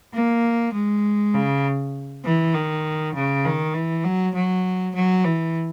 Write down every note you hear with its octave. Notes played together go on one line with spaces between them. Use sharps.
A#3
G#3
C#3
E3
D#3
C#3
D#3
E3
F#3
F#3
F#3
E3